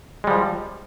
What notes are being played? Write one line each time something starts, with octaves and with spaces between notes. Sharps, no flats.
F3 G3 G#3